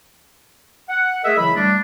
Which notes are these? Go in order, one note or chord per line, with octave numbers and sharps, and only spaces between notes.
F#5
A3 G#4 A#4 D#5 E5
C#3 E3 F#3 E4 B5
G3 A3 D4